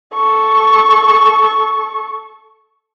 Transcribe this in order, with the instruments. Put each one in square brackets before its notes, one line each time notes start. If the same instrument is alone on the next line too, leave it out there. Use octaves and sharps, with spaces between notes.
[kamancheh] A4 C#6